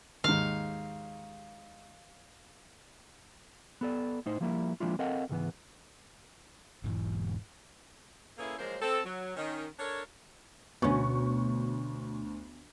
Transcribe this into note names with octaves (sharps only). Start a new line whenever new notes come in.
D#2 G#2 F5
B3 A4 D5
A2 D#4 C5
F3 G3 A#3 E4
F3 G#3 A#3 D4 E4 F4
C4 A4 A#4 D#5 F5 F#5
C#2 G#2 E3 B3
E1 G#2 E3
A#3 C#4 E4 G#4 A4 B4
F3 F#3 G#3 A#3 C5
C4 A4
F#3
D#3 C#4
D4 A4 A#4 C#5
D2 B2 B3 C#4 C#6